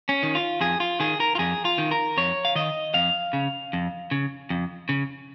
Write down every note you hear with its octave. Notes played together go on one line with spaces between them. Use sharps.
C#4
D#3
F4
F2 G#4
F4
D#3 G#4
A#4
F4
F2 G#4
F4
D#3
A#4
F2 C#5
F5
D#3 D#5
F2 F5
C#3
F2
C#3
F2
C#3